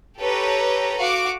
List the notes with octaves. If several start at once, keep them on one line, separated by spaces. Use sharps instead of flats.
G4 A4 B4 C#5 A#5
F#4 F5 D6